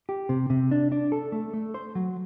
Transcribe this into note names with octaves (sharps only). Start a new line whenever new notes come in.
G4
C3
C3
D4
D4
A4
A3
A3
C5
F#3